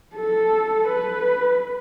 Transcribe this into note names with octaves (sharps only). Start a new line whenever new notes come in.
A4
B4